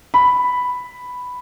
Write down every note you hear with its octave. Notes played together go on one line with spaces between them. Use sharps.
B5